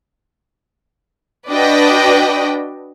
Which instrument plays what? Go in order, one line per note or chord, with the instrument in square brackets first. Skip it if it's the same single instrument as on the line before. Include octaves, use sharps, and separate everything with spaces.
[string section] D4 F#4 B4 D5 D#5 G5